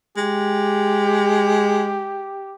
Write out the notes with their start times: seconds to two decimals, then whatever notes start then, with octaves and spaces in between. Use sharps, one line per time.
0.17 G#3 G4